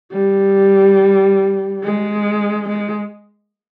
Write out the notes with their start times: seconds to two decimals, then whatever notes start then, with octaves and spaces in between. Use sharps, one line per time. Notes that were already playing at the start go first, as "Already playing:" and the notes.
0.12 G3
1.83 G#3
2.69 G#3